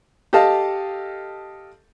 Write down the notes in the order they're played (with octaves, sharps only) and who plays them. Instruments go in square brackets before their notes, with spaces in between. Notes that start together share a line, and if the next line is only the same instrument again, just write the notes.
[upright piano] G4 A4 D#5 F5 A5